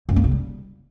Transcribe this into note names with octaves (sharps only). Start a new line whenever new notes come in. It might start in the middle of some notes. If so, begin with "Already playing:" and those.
F#2
A#3
C#3
G3